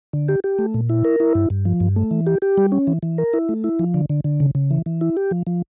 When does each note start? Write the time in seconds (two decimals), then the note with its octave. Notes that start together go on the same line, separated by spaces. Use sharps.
0.13 D3
0.28 G4
0.44 G4
0.59 A3
0.74 A#2
0.89 E4
1.05 A#4
1.20 E4
1.35 G2
1.50 G2
1.65 F3
1.80 G2
1.96 A3
2.11 E3
2.27 G4
2.42 G4
2.58 G3
2.72 C#4
2.87 E3
3.03 E3
3.18 A#4
3.33 E4
3.49 A3
3.64 E4
3.79 F3
3.94 D3
4.10 D3
4.24 D3
4.40 C#3
4.55 C#3
4.71 E3
4.86 E3
5.01 E4
5.17 G4
5.31 F3
5.47 F3